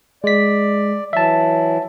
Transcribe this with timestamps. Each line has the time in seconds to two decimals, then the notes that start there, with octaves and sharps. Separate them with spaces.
0.24 G#3 D5 B6
1.13 E3 F#3 E5 A5